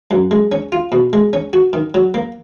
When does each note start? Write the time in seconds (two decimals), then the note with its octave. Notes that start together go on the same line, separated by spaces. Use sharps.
0.11 F#2
0.31 G#3
0.52 C#4
0.72 F4
0.92 B2
1.13 G#3
1.33 C#4
1.53 F#4
1.73 D#3
1.94 F#3
2.14 A#3